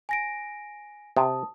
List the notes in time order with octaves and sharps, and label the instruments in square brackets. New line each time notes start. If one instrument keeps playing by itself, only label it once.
[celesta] G#5 A#6 D7
[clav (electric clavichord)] C3 [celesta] A5 D#6